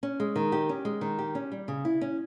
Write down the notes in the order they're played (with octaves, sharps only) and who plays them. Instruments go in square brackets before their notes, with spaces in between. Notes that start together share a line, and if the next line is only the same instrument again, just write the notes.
[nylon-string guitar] C#4
G#3
D#3
G4
C#4
G#3
D#3
G4
C#4
G3
C#3
E4
C#4